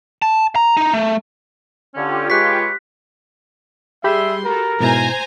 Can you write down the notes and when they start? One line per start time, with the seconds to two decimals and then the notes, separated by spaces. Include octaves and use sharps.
0.22 A5
0.56 A#5
0.77 D#4
0.94 A3
1.95 D3 C#4 F4 G4
2.30 G#3 B4 C#5 F#6 B6
4.04 G3 G4 G#4 E5 B5 C6 G6
4.45 F#4 A4 A#4
4.80 G#2 B2 E4 C5 G#5 A#5